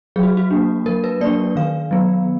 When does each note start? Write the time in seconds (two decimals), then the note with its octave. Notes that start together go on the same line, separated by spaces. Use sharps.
0.16 F#3 G#4
0.23 F#4
0.37 F#4
0.51 A#3 D4
0.86 F#3 A#4
1.04 B4
1.21 A#3 D4 D5
1.56 D#3 F5
1.91 F#3 B3